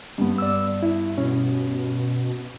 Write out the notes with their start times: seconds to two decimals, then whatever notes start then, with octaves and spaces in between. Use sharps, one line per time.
0.18 G2 B3
0.38 D5 E6
0.83 E4
1.18 B2 C#4